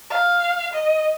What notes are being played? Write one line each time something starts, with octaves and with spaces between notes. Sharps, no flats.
F5
D#5